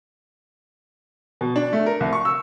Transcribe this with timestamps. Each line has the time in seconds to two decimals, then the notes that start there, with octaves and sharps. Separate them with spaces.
1.41 B2
1.56 D4
1.73 A3
1.86 A#4
2.00 C2
2.13 C#6
2.25 E6